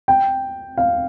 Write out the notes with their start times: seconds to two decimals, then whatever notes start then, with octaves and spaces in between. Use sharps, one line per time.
0.08 G5
0.78 F5